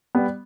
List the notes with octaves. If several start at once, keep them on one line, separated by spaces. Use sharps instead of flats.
G3 B3